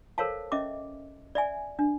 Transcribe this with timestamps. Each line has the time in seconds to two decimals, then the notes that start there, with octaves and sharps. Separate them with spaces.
0.18 A4 A#4 C5 C#5 F5 A5
0.52 C#4 D#5 E5 D6
1.35 D5 E5 G#5
1.79 D4